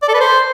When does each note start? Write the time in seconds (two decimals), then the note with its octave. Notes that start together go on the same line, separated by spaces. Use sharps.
0.02 D5
0.08 A4
0.14 B4
0.20 C5